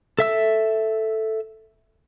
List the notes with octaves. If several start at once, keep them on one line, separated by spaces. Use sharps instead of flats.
A4 E5 E6